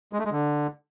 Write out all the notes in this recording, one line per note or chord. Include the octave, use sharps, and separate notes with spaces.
G#3
A3
G#3
D3